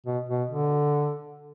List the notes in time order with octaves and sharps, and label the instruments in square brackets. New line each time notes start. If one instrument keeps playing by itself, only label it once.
[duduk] B2
B2
D3